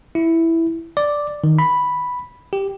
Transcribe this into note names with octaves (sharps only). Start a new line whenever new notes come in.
E4
D5
D#3
B5
G4